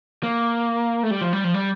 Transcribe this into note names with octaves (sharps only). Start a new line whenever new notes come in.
A#3
A3
G3
F3
G3
F3
G3